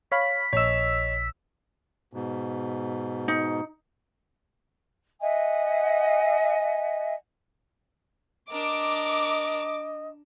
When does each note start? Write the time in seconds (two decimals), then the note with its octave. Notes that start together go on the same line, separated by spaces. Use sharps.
0.12 C#5 F5 B5 B6
0.53 A#1 C#5 D#5 E6
2.13 G#2 B2
3.28 D#4
5.20 D#5 E5 F#5 G#5
8.50 D4 A#4 D#5 D6